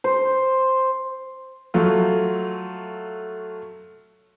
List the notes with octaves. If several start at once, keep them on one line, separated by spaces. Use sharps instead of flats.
C5
F#3 A3 F4